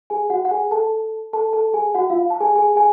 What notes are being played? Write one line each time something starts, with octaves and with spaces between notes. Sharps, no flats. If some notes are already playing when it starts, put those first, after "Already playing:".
G#4 G#5
F#4 F#5
F#5
G#4 G#5
A4 A5
A4 A5
A4 A5
G#4 G#5
F#4 F#5
F4 F5
A5
G#4 G#5
G#4 G#5
G#4 G#5